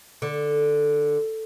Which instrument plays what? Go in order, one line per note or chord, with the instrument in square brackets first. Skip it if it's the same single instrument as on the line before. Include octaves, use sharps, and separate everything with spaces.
[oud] D3